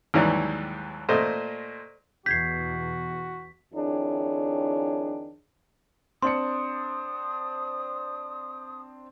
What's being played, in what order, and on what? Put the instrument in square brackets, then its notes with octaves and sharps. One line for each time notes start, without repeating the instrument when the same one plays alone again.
[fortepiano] D#2 G#2 E3 F#3 G3
A#2 A3 C5 D#5
[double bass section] E2 B2 E3 [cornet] F#4 [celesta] G6 G#6 C7 [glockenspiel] B6
[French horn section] F2 D#3 D4 E4 G#4 C#5
[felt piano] C4 D4 C#7 [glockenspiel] C6 [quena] D#6